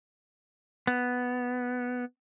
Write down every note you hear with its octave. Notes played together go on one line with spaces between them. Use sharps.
B3